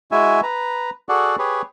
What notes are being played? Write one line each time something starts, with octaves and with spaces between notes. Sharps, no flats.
G#3 E4 F#4 E5 G#5
B4 A#5
F#4 G#4 A4 D5 F#5
G4 G#4 B4 C#5